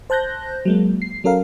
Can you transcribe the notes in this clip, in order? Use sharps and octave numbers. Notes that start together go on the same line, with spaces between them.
C5 A5 F#6 G6 A#6
F#3 G#3 A#3
C7
F#3 C#4 A4 A#4 F5